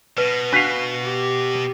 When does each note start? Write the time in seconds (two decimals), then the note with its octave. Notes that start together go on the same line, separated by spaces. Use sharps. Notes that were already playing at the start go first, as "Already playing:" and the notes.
0.18 B2 B4
0.53 D4 F#4 B4 F5
1.03 G4